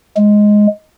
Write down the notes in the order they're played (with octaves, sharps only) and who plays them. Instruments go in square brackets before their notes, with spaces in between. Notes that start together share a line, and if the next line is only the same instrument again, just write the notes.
[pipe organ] G#3